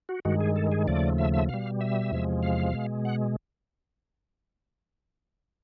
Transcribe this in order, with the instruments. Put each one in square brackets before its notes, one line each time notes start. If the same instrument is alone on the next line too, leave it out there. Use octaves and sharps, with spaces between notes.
[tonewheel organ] F#4
G2 D#3 G#3 F#4
G#4
A4
G#4
D#2 C#3 F3 A3 D5
E5
E5
B2 G3 F5
E5
E2 C3 F3 G#3
F5
B2 G#3
F#5